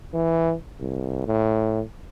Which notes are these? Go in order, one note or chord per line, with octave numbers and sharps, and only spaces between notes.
E3
C2
A2